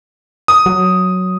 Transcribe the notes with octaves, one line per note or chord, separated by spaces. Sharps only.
D#6
F#3